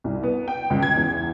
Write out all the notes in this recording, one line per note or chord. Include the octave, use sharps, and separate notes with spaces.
C2
B3
G5
C#2
G#6
E2